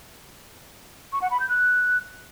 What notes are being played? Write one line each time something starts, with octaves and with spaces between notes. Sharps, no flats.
C#6
F#5
B5
G6
F#6